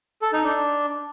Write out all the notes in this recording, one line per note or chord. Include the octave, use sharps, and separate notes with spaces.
A4
D#4
D4